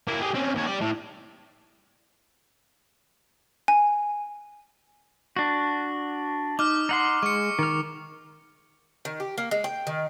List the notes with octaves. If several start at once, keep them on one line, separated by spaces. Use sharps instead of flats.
A#3 E4
G4 G#4
C4 C#4
D#2 C#5
G4 D5
A2
G#5
D4 F#4
D#4 D6 F6
D#4 F#5 C6
G#3 C#6 C#7
D#3 F6
D#3
G4
A#3
G#3
G5
D#3